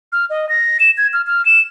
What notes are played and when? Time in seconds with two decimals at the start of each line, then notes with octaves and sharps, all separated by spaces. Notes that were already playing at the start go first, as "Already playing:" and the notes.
0.12 F6
0.30 D#5
0.49 A#6
0.80 E7
0.97 G#6
1.13 F6
1.27 F6
1.45 E7